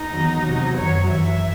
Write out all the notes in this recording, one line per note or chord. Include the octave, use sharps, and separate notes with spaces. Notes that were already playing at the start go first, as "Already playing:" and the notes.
Already playing: D#4
E2 D#3 F#3
E2 C3 F#3
F#2 D#3 F#3 C#5
F#2 E3 E5